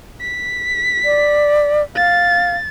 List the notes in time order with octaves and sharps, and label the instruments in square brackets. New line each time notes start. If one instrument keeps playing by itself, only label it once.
[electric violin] B6
[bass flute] D5
[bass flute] F5 [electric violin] A6